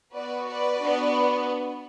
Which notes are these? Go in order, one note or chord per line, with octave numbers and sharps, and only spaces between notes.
B3 F#4 B4 D5
B4 D5
B3 D4 F#4